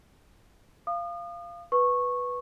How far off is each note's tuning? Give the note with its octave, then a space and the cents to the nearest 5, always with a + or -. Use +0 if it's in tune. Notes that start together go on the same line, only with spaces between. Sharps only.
F5 -15 D#6 -40
B4 +0 C#6 -15